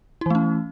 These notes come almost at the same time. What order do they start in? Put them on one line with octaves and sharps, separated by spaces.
E4 E3 A3 C#4